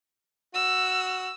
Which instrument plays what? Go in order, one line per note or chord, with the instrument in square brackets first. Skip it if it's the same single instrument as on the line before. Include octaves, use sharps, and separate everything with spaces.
[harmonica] F#4 [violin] E6